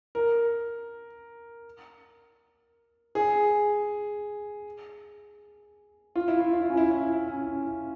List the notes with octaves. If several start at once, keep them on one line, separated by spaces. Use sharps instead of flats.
A#4
G#4
F4
E4
F4
F4
E4
C#4
E4
E4
C#4